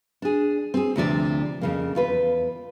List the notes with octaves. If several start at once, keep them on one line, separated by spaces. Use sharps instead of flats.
D4 G#4
C4 G#4
D2 C3 F3 D5
F2 C#3 A#3
E2 F4 B4